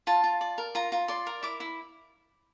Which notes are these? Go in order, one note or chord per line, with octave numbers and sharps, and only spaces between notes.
F4 A5
F4
D5
A#4
F4 A#5
F4
D5 C6
A#4
E4 D6
E4